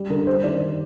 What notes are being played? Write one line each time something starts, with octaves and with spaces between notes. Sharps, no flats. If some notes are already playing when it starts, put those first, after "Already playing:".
Already playing: G3
D3 A#4
G3 C5
D#3 D5